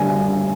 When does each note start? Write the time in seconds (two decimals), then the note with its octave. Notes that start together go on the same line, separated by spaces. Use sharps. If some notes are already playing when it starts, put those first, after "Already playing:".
Already playing: D3 G3 G#5